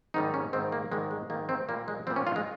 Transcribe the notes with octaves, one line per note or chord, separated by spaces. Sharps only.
G#2 D#3 G3 D#4
C#4
G#2 D#3 G3 C4
A#3
G#2 D#3 G3 G#3
G#3
G#2 D#3 G3 A#3
C4
A#2 G3 A#3
G#3
A#2 G3 C4
C#4
F4
G#3